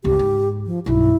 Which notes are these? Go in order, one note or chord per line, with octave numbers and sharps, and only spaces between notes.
G1 C#2 G4
G#2
F3
B1 G2 E4